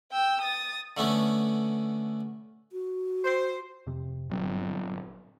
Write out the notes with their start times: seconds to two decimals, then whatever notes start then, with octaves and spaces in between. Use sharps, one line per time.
0.12 G5 E6
0.42 D#6 A6
0.97 D3 A3 B3 C#4
2.72 F#4
3.25 C5
3.87 F2 C3
4.30 G1 A#2 F#3 C4